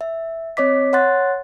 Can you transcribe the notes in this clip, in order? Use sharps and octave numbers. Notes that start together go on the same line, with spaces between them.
E5
C4 C#5 D#5 D6 B6
C#5 F#5 C6 F#6 A6